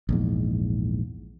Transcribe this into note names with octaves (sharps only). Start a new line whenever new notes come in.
A#1 E2 G#2